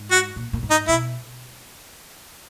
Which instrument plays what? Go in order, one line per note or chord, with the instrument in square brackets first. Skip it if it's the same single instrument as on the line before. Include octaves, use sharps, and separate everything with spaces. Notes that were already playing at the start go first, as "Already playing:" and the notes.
Already playing: [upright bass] G#2
[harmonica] F#4
[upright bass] A#2
A#2
G#2
[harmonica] D#4
[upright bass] B2 [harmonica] E4